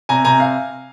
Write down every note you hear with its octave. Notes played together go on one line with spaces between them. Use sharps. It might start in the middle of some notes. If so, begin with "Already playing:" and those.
C3 G#5 A#5
C3 G#5 A#5
F5